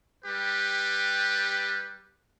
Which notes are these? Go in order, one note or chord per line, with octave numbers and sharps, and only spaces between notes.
G3 G4 B4